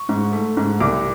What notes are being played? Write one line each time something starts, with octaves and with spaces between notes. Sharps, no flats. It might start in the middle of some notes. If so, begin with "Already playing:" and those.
Already playing: C#6
G#2
A3
G#2
C2 D6